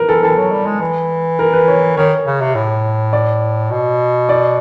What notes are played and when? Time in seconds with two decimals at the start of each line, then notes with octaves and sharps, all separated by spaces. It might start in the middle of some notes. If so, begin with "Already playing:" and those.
Already playing: A#4 B4
0.08 E3 A4
0.23 E3 A4
0.37 F#3
0.51 G3
0.66 G#3
0.80 E3
1.39 A#4
1.53 B4
1.68 C#5
1.97 D#3 C#5
2.26 C#3
2.41 C3
2.55 A2
3.13 D5
3.71 B2
4.29 D5